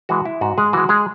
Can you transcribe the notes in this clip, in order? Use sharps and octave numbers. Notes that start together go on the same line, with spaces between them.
E3 G#3 F#4
E4
G#2 F#4
G#3 G#4
E3 G#3 F#4
G#3 G#4